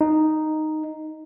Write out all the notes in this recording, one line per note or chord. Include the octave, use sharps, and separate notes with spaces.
D#4